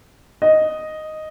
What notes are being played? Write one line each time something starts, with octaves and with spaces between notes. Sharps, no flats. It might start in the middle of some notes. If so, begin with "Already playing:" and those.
D#5